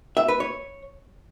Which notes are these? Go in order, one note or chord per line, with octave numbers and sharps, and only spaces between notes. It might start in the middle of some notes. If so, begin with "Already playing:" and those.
E5
B4
C#5